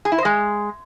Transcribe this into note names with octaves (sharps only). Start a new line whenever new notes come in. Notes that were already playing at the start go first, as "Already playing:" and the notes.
G#4
E4
C5
G#3